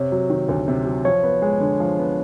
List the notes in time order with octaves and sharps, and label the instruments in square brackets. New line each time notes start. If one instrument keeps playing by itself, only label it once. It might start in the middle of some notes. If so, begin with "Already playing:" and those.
Already playing: [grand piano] C3 [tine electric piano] C#5
[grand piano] F#3
D#3
D2
C3
F#3
[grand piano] F3 [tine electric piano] C#5
[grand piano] B3
G#3
D3
F3
B3